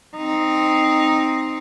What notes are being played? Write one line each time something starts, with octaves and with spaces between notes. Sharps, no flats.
C4 D#4